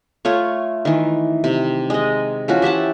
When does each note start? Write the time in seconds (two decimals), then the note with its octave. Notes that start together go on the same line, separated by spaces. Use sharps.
0.25 A3 F4 C#5
0.85 D#3 E3
1.44 C3
1.90 G#3 D#5
2.48 E3 F3 C#4 F#4
2.62 G4 E5 F#5 A5